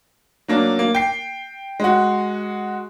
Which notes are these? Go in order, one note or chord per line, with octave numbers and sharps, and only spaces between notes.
F#3 A#3 D4
A#3
G5 C7
G#3 F#4